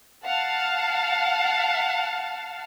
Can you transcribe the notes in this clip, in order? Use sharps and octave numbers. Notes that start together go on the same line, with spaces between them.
F5 F#5 A5